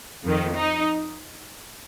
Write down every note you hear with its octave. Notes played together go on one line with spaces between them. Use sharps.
F2 D#3
D#4